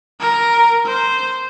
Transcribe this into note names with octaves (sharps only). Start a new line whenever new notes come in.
A#4
C5